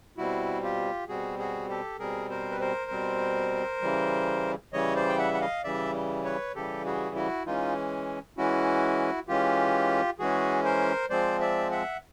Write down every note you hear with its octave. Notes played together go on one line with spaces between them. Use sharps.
B2 G3 C4 E4 F#4
F4 G4
B2 G3 C4 F#4 G#4
F#4 G#4
G4 A4
B2 G3 C4 G#4 A#4
A#4 C5
B4
A#4 C5
B2 G3 C4
C#3 E3 G3
C#3 E3 G3 C#5 D#5
C5 D5
G5
E5 F#5
F#5
D#5 F5
C#3 E3 G3 D5 E5
B4 C#5
C#3 E3 G3 G4 A4
F#4 G#4
E4 F#4
E3 G#3 C#4 D#4 F4
E3 G#3 C#4 E4 F#4
E3 G#3 C#4 F4 G4
E3 G#3 C#4 F#4 G#4
A#4 C5
F3 G#3 C4 C5 D5
D5 E5
E5 F#5